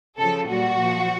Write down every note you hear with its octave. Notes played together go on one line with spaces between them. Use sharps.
C#3 F3 A4
A#2 G3 F#4
A#2 F3